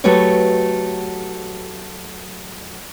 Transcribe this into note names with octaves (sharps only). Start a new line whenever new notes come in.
F#3 A3 F#4 G4 B4 C#5